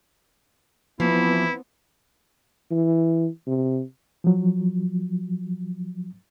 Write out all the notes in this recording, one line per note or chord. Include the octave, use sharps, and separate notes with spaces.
E3 F3 B3 C4 E4
E3
C3
F3 F#3